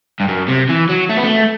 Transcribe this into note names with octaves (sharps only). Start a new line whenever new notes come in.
G2
F#2
C3
E3
F#3
A3
B3
A3